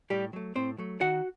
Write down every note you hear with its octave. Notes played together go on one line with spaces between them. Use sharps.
A2 G3 G4
F#3 A3
A2 C4 C5
F#3 A3
D#3 F#4 F#5